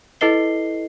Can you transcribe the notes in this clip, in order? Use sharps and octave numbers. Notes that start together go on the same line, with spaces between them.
E4 A4 B4 D#5 C7 G7